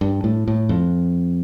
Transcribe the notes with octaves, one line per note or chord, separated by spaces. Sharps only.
G2
A2
A2
F2